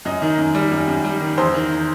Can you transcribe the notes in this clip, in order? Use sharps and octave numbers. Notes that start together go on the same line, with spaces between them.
F#2 D#5
D#3
F#2
G3
F#2
F#2
G3
D#3
E2 C5
D#3